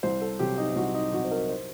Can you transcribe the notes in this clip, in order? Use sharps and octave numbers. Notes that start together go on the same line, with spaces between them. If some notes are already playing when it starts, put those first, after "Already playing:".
C2 C5
A4
C3 F#3 G4
D#4
C2 F#4
D#4
C3 F#3 F#4
C5
A#4
C5